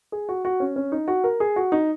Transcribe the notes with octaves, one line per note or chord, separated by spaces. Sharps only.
G#4
F#4
F#4
C#4
C#4
D#4
F#4
A#4
G#4
F#4
D#4